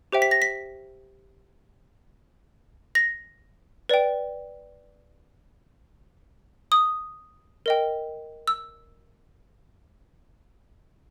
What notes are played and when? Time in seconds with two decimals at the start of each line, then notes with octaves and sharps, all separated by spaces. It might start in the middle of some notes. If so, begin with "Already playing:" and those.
0.12 G4 C5 E5 G5
0.22 B6
0.31 A#6
0.42 B6
2.95 A#6
3.89 B4 D5 G5
6.72 D#6
7.66 A#4 D#5 G5
8.47 E6